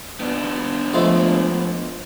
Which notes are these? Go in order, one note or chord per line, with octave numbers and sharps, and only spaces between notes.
B3 D4
F3 G#3 A3